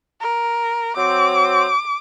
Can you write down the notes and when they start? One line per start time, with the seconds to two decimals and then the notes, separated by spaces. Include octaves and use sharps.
0.20 A#4
0.97 F#3 C4 D6